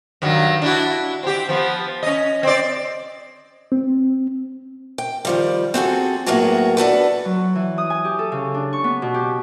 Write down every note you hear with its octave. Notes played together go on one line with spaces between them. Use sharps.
G2 D#3 F#3
D4 E4 F#4
C4 G4
F3 B3
C#4 D#5
C4 D5
C4
G5
D#3 F3 G3
C4 F#4 G#4 A4
A2 F#3 A#3 B3 F#4 G#4
D4 F#4 A4 B4
F#3
E3
D#6
G#5
G4
A4
C#3
D4
C#6
B3
B2
G4